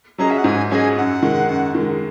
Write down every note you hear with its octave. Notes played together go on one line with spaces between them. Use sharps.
F#3 C#4 G#4 D#5 A#5
E5
F#5
G#2 G#5
F#3 C#4 G#4 D#5 G#5
F#2 F#5
D#3 G#3
F#2
D#3 G#3